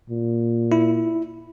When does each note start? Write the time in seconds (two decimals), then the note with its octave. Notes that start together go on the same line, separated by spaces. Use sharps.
0.10 A#2
0.72 E4